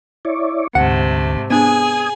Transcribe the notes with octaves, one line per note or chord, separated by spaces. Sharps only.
E4 C#5 D5
D2 G#2 C3 A3 F#5
B3 D4 G#4 G#5 D#6